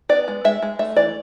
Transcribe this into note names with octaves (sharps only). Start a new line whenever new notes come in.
B3 D5
G#3
G#3 E5
G#3
A3 E5
E3 D5